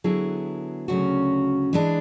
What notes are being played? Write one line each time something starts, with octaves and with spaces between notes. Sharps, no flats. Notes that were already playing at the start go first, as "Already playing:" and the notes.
D3 F#3 B3 E4 G#4
D2 C#3 F#3 C#4 F#4
E3 G#3 D4